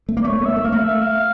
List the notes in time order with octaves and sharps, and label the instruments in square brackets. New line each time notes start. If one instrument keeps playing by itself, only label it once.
[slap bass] A3
A#3
[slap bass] A3 [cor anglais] D5
[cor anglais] C#5
[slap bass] A#3
A3
[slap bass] A#3 [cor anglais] E5
[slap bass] A3
[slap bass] A#3 [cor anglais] F5
[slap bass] A3
[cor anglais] E5
F5